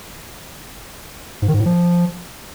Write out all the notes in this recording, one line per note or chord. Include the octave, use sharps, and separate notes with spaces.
G#2
D#3
G#2
A2
F3